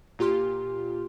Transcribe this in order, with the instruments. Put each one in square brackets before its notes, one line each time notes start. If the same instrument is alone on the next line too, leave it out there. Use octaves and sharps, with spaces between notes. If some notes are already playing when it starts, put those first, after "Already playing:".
[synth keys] A#2 F4 G4 C6 F6